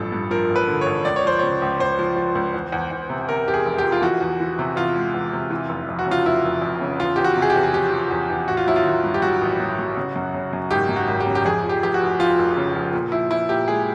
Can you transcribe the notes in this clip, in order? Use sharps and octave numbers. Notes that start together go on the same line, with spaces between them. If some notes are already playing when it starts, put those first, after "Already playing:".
Already playing: A1 G2 F3 A4
G2
F3 A#4
A1
B4
D3
A1 C#5
C#2 D5
C#5
F3 C5
C#3 C#5
C#2
C#2 C5
F3
F3
C#2
E2
E2
E2
C3
C3 A#4
E2 G4
G#4
F1
G4
F3
F4
E3 F#4
E2
E3
C3
E2 F4
G#3
E2
C3
E3
F1
F2
F#4
C#3
F4
F1 E4
F1
F2
C#3
E2 F4
E2 G4
F#4
C3
G#4
G4
E2
G#4
F3 G4
F3
E2
E2
A1 F#4
F4
F#3 E4
F4
D#3
G2
G4
F#3 F#4
A1
F#3
F#3
C#3
F#2
C#3
F#2
G#1 G4
F#2
F#4
G#1
G4
C#3
G4
F2 G#4
F3
G4
F1 G4
F#4
F1
F3 F4
F1
C#3
F3
A#2
F3 E4
F3 E4
A#2 G4
G#3 G#4